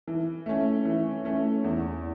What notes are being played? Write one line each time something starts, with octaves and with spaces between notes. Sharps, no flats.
E3
A3 C#4
E3
A3 C#4
E2